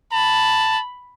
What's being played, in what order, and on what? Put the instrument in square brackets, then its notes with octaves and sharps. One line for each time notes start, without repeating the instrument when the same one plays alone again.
[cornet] A5 [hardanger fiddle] B5